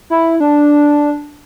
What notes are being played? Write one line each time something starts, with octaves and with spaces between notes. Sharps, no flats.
E4
D4